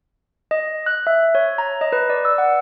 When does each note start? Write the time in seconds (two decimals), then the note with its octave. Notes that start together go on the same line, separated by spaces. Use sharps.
0.51 D#5
0.86 F#6
1.07 E5
1.35 C#5
1.58 A#5
1.81 D#5
1.92 B4
2.10 D5
2.25 E6
2.38 F#5